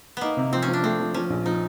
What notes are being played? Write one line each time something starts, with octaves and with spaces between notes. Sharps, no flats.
A#3 B3 D#4
C3
F3 C4
C#4
F3
D4
A3 C4
F3
F3 C#4
A#1
F3 D#4